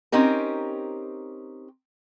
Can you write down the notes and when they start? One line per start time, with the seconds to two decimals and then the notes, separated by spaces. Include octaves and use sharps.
0.12 C4 C#4 D#4 G4 A#4